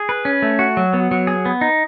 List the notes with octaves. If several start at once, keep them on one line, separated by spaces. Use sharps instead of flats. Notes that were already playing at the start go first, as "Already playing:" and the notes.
Already playing: G#4
B4
C#4
A3
F#4
F#3
B3
F#3
G#4
B3
D#4